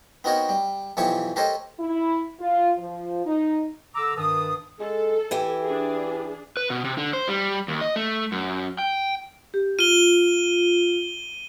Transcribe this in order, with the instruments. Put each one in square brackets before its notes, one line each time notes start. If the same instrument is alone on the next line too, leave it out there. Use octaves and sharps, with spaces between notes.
[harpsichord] B3 C4 D#4 F#4 A#4 C#5
G3
B1 E3 F3 G4 C#5 C#6
G4 A4 A#4 C5 C#5 D#5
[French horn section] E4
F4
F3
D#4
[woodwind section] D3 A#5 D6 E6
G2 D#3 B4 A5 D#6
[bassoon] G#3 [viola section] A4
[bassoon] E3 [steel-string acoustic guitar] E4 G4 G#5
[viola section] D4 G#4
[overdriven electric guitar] B4
B2
C3
D3
C5
G3
D#2
D#5
A3
F#2
G5
[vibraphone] G4
[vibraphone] F4 [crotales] D#7 G7